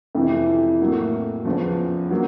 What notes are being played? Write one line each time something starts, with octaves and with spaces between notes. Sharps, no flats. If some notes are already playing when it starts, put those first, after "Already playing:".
F2 C3 E3
A2 F#3 A#3
E2 C#3 F3
F#3 A#3